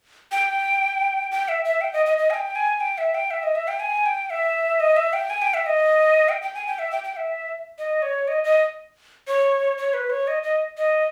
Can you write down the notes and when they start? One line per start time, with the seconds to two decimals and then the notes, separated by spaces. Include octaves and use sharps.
0.32 G5
1.31 G5
1.48 E5
1.65 E5
1.81 G5
1.93 D#5
2.06 D#5
2.18 D#5
2.30 G#5
2.34 G5
2.55 G#5
2.80 G5
2.98 E5
3.14 G5
3.31 E5
3.43 D#5
3.55 E5
3.68 G5
3.80 G#5
4.06 G5
4.30 E5
4.80 D#5
4.96 E5
5.13 G5
5.30 G#5
5.42 G5
5.54 E5
5.66 D#5
6.29 G5
6.42 G5
6.54 G#5
6.67 G5
6.79 E5
6.91 G5
7.04 G5
7.16 E5
7.78 D#5
8.02 C#5
8.28 D#5
8.44 D#5
9.27 C#5
9.78 C#5
9.94 B4
10.10 C#5
10.28 D#5
10.43 D#5
10.77 D#5